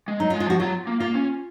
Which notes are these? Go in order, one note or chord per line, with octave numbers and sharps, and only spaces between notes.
G#3
F#3 D#4
F4
G#3
F4
F3 F#4
F#3 F4
A#3
A#3 F4
C#4